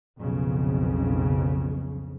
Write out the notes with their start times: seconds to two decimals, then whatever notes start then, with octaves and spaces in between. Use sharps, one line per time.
0.19 B1 F2 C#3